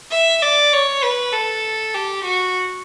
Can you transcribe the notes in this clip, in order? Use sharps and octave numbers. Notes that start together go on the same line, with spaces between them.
E5
D5
C#5
B4
A4
G4
F#4